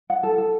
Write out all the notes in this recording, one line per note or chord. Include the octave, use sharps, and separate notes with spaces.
F#5
A4
A4